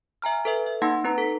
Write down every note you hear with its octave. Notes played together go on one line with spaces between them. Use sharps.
E5 G#5 A#5 F6
A4 B4 E5
E5
A#3 D#4 F#5 A5 C6 A#6
C4 D#4 B4 A#5
A4 B6